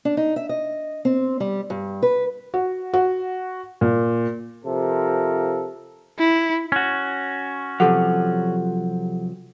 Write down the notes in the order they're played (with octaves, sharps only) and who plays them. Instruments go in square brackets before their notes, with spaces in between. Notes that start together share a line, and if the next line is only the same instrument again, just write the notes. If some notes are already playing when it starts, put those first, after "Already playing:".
[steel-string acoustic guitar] D4
D#4
E5
D#5
C4
G3
G2
B4
[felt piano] F#4
F#4
A#2
[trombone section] C3 F3 F4 A4 A#4
[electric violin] E4
[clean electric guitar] C#4 F#4
[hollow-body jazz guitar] C3 F3 F#3 [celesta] G4 A4 F#5